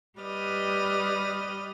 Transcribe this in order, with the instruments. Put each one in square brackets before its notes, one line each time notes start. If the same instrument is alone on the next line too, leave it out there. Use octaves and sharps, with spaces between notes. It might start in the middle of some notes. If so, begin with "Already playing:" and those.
[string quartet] G3 G4 B4 D5 D#5 F6